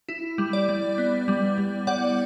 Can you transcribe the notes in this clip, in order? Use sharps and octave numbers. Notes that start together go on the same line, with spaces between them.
E4
G3
D5
G3
B3
G3
G3
G3 D5 F#5